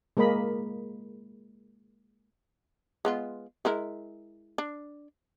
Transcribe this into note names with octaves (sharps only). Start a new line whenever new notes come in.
G#3 A#3 A#4 D#5 B5
G#3 B3 F4
G#3 E4 A#4
D4